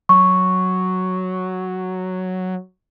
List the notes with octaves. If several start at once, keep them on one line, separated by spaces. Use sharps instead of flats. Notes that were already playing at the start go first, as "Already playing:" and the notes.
F#3 C#6